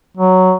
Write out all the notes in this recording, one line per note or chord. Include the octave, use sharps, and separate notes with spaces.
F#3